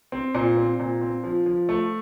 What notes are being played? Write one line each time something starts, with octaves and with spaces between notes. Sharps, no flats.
C4
A#2
C4
A#2
C4
F3
F3
A3